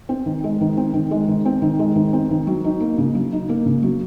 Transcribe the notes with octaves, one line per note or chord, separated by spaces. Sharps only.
C4
D#3
G#3
D#3
C4
D#3
G#3
D#3
C4
D#3
G#3
D#3
C4
D#3
F#3
D#4
A#3
C#3
F#3
D#4
A#3
C#3
F#3